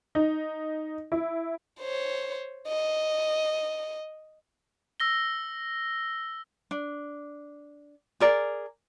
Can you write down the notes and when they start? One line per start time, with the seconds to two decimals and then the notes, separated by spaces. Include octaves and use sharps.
0.15 D#4
1.12 E4
1.81 C5 C#5
2.68 D#5
5.00 E6 A#6 G7
6.71 D4
8.20 G#4 A#4 D5